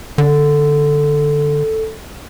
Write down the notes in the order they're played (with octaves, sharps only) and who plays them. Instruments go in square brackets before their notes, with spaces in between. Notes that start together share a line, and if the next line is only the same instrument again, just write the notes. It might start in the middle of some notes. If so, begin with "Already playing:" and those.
[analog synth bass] D3 [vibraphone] A4